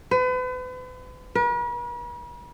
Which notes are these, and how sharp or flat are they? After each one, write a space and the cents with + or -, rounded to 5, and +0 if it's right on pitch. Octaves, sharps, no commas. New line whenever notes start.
B4 +40
B4 -45